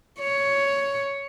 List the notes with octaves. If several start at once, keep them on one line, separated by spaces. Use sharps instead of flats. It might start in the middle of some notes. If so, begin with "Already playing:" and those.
C#5